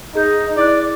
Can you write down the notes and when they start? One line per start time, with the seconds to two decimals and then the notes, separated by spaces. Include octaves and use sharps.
0.15 D#4 G#4 G6
0.57 E4 D5 F#6